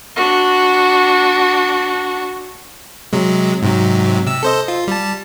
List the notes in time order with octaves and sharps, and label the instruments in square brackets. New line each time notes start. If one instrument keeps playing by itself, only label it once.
[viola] D4 F#4
[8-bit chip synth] C3 F#3 G#3
G#2 C3 F#3
C3 E6
A4 C5 D#5
F4
G3 A5